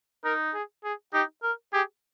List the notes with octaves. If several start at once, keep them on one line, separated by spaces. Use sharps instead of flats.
D#4 A#4
G#4
G#4
D#4 G4
A#4
G4 G#4